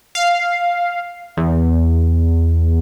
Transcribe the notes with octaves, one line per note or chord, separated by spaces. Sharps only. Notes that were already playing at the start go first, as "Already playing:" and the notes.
F5
E2